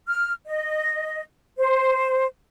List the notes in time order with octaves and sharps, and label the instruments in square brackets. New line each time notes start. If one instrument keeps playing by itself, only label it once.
[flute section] F6
D#5
C5